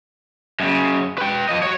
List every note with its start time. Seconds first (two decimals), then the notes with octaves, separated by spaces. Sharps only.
0.60 F#2 C#3
1.18 B4 G5
1.49 F3 D#5
1.63 F#4 C#5